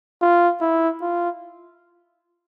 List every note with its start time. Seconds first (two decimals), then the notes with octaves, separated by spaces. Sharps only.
0.22 F4
0.61 E4
1.02 F4